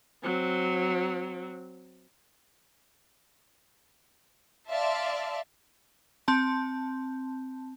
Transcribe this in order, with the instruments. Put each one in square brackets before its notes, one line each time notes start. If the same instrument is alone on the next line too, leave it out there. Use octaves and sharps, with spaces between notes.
[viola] F#3 C4
[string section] D5 E5 F5 A5 C6
[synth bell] C4 A5